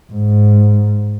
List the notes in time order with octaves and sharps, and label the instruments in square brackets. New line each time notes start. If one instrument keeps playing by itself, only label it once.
[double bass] G#2